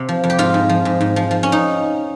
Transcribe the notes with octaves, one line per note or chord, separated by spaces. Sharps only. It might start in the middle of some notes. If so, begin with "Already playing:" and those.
Already playing: C3
F3
F2
G4
G#2 F4
G#2
F3
G#2
G#2
F3
F3
C#4
D#4